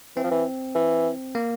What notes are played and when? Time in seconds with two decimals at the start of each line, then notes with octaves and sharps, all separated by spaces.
0.16 E3 C4
0.24 F3
0.31 E3
0.75 E3
1.35 A#3